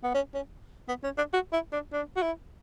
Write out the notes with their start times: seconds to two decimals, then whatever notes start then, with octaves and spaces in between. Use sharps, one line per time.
0.03 B3
0.14 C#4
0.34 C#4
0.88 B3
1.04 C#4
1.18 D4
1.33 F#4
1.52 E4
1.73 D4
1.93 D4
2.16 F#4
2.22 E4